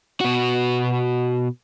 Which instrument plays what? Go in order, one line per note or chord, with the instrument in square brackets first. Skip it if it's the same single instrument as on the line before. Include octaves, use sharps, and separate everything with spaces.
[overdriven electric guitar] B2 F#4